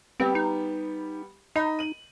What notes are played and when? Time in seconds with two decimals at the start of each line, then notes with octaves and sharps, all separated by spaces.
0.20 G3 B3 C4 G4
0.35 D#4
1.56 D#4 D#5 B5
1.79 D#7 F#7